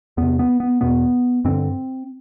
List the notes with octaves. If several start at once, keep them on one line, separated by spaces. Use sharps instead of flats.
E2 C3 B3
B3
B3
E2 B2 B3
G2 D3 C4